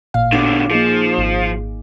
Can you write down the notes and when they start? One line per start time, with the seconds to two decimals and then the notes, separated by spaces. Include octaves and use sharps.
0.14 A1 A#2 F5
0.33 B2 D3 D6
0.71 F3 A#3 D#4 G#4
1.18 G#1